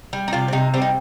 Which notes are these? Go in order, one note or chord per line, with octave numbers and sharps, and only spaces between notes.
G3
D#4
C3 F4
C4
C3 D#4
G3 C4
D#4